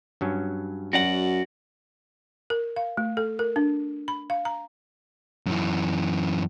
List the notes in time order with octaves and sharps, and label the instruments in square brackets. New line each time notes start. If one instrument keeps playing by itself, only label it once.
[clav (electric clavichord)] G2 F#3 C#4
[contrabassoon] F#2 [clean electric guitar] F#4 D5 F#5
[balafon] A#4
F5
A3
A4
A#4
D4
B5
F5
A#5
[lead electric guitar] F#2 E3